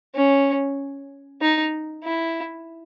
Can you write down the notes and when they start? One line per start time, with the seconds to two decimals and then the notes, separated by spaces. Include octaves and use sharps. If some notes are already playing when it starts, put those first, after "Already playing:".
0.15 C#4
1.41 D#4
2.04 E4